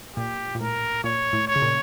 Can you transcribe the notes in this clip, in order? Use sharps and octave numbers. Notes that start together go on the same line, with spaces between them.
A#2 G4
A#2
A2 A#4
A#2 C#5
A2
C#5
C#3
A#2